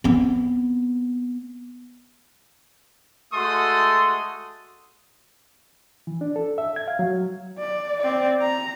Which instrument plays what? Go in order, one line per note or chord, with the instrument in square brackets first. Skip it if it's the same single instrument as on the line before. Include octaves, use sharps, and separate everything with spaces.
[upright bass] B3 C4
[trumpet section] G#3 A3 F#4 A4 C6 D#6
[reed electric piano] E3
D4
A4
E5
G#6
F5
F#3
[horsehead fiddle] D5
C4 D5
A#5